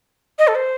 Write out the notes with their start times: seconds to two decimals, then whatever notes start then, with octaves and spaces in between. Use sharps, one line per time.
0.39 D#5
0.48 A4
0.55 C5